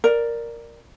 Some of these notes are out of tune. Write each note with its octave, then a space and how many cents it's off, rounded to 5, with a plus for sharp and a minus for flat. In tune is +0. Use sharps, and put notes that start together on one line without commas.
A#4 +0 D5 +5